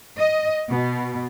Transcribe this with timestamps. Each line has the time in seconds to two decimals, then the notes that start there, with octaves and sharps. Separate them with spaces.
0.18 D#5
0.69 B2